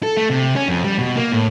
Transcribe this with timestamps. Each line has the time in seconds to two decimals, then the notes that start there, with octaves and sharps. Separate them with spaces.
0.03 A4
0.17 A3
0.30 C3
0.56 C#4
0.69 F2
0.84 G3
0.99 B2
1.17 A#3
1.32 A2